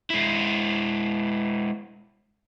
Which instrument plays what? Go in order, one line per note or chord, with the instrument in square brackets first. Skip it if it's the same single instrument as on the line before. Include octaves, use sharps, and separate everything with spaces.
[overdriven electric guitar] G#3 E4